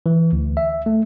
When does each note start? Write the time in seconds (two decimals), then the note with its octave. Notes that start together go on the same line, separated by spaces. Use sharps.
0.06 E3
0.33 D2
0.57 E5
0.86 A3